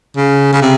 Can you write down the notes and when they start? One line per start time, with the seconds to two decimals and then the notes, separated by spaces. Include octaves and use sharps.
0.17 C#3
0.53 C#3
0.62 C3